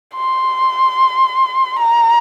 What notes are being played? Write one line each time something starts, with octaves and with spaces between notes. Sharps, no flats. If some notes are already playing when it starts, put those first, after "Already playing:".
C6
A#5